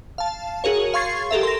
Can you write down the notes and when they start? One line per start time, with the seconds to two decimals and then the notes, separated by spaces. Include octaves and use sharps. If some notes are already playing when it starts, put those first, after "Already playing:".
0.18 F5 A5
0.64 F#4 G#4 A#4 C#5
0.94 F5 C6 C#6 G#6 A6 C7
1.31 G4 A4 A#4 E5
1.43 C6 A#6